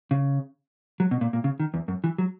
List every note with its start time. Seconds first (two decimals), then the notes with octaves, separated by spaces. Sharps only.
0.11 C#3
1.00 F#3
1.11 B2
1.21 A#2
1.33 A#2
1.44 C#3
1.60 D#3
1.74 E2
1.88 F#2
2.04 E3
2.18 F#3